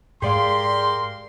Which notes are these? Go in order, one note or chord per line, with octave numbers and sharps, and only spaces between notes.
G#2 G#3 G4 G#4 A#4 D5 F5 C6